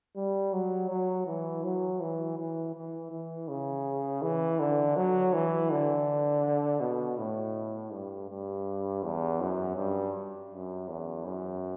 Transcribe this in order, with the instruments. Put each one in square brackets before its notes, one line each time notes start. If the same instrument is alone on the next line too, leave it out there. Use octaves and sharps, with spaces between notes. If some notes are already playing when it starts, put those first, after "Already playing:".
[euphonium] G3
F#3
F#3
E3
F#3
E3
E3
E3
E3
C#3
E3
D3
F#3
E3
D3
B2
A2
G2
G2
E2
F#2
G2
F#2
E2
F#2